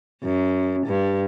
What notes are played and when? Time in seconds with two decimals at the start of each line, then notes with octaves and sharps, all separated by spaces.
0.23 F#2
0.87 G2